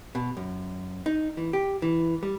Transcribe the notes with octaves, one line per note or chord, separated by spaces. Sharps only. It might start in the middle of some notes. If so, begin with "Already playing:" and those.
B2
F#2
D#4
E3
G4
E3
G3